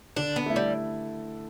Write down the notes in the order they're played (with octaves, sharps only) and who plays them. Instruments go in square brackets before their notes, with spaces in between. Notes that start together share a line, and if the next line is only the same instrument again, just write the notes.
[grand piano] D3 [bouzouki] D4
[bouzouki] B3
[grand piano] A3 E4
[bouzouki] G3